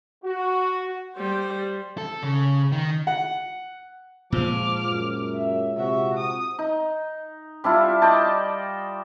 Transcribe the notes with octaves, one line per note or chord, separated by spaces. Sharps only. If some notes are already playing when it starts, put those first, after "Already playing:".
F#4
G3 C5
A4
C#3
D#3
F#5
A#2 F3 G#3 D6 F6
F#2
E5
C3 F#4 E5
D#6
D#4
G3 D4 E4 F4
D5 D#5 G5 A5